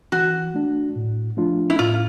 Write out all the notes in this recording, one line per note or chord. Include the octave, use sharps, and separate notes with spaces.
E3 F#4
A3 D4
A2
F3 A3 D4 F4
E4
A2 F4